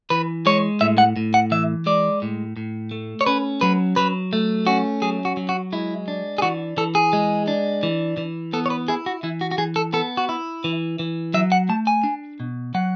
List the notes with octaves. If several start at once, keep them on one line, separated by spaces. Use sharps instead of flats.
E3 B4
G#3 C#5
A2 E5
F#5
A2
F#5
E3 E5
G#3 D5
A2
A2
A3
C#5
C#4 B4
F#3 B4
F#3 B4
A3
C#4 F#4
F#3 G#4
F#4
F#3
F#4
G#3 E4
D4
G#4
E3 F#4
E3 A4
G#4
G#3
D4
E3
E3
B3 A4
C#5
B4
E4 G#4
F#4
E3 E4
F#4
F#4
E3 G#4
A4
B3 A4
F#4
E4
E3
E3
F#3 E5
F#5
A3 A5
G#5
D4
B2
F#3 F#5